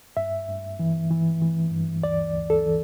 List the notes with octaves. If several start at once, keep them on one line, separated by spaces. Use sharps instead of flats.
G2 E5
G2
E3
E3
E3
G2
D2 D5
D2
A4
E3